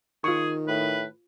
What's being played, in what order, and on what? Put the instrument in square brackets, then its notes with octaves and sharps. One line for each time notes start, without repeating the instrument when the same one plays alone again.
[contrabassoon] D#3 [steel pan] F4 C#6 [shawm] G#4
[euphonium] A2 [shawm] B4